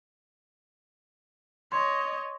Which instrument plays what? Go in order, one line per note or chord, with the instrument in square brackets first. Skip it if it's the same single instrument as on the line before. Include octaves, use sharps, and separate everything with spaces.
[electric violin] C#5 D#5 [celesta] C6